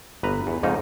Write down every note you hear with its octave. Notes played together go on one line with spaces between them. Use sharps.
G1 B4 A#5
E2
F2 G#2 C#3 D#4